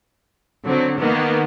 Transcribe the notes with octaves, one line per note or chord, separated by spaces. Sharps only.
D3 F#3 C4
D#3 A#3 B3